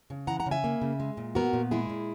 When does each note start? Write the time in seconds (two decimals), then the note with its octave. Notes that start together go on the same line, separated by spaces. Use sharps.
0.10 C#3
0.27 E3 F#5 A#5
0.40 F#5 A#5
0.46 C#3
0.51 E5 G#5
0.64 A#3
0.82 C#3
1.00 G#3
1.17 A#2
1.35 B3 F#4 A#4
1.53 A#2
1.71 G#3 E4 G#4
1.89 A#2